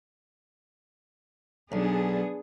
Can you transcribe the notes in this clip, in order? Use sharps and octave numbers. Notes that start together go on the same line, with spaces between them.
B1 B3 D4 G#4